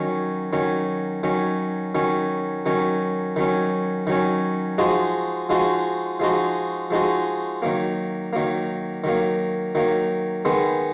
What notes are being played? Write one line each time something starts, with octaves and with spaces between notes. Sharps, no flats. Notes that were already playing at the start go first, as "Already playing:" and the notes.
Already playing: D#3 F#3 C#4
D#3 F#3 C#4
D#3 F#3 C#4
D#3 F#3 C#4
D#3 F#3 C#4
D#3 F#3 C#4
D#3 F#3 C#4
F3 G#3 D#4 F#4
F3 G#3 D#4 F#4
F3 G#3 D#4 F#4
F3 G#3 D#4 F#4
D#3 F#3 A#3
D#3 F#3 A#3
D#3 F#3 A#3
D#3 F#3 A#3
D#3 G#3 B3